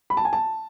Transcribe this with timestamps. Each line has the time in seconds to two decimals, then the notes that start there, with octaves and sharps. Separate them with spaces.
0.10 B5
0.17 A5
0.25 G#5
0.33 A5